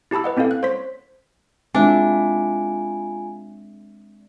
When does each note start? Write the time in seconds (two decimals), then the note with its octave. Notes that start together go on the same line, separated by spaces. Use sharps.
0.11 E4 G4 A5 B5 E6
0.24 B4 D#5 F#5
0.37 C4 C#4 E4 A4 F5
0.51 F#6
0.63 C5 C#5 C6 B6
1.75 G#3 C4 D4 F4 E5 G#5